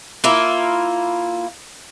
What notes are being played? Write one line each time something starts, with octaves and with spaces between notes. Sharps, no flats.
A#3 E4 F4